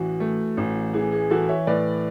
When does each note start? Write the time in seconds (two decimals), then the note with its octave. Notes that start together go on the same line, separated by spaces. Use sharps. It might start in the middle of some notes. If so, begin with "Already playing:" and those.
Already playing: A1 E3 F#4
0.20 A3
0.57 A1
0.94 E3 G#4
1.12 G#4
1.30 E3 F#4 A4
1.49 C#5 E5
1.67 A2 B4 D5